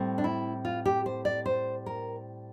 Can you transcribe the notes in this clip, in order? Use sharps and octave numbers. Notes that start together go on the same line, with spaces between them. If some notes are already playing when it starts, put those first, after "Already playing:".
Already playing: A2 G3 C4
D4
E4
F4
G4
C5
D5
C5
A#4